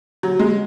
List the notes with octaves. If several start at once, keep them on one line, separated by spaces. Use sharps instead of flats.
F#3
G#3